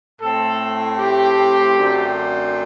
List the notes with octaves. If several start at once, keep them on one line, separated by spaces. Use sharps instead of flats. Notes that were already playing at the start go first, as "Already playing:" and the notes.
A2 A3 C4 A4
G4
F#2 D3 A3 C4